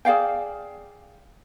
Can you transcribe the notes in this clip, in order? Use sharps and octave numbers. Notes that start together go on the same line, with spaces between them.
G#4 D5 F5 G5